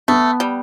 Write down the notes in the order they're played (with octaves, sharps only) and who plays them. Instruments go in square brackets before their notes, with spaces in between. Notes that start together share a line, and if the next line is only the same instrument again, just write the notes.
[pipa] A3 [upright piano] B3
[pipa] G3